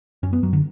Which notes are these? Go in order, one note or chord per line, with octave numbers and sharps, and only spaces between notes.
F#2 C#4
B3
F#2 F#3
D3